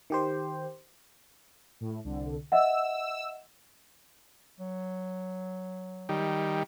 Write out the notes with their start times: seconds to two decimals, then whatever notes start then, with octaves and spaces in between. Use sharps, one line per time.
0.10 D#3 G4 C5
1.81 A2
2.04 C2 D3
2.52 D#5 E5 F#5 E6
4.60 F#3
6.09 D#3 G3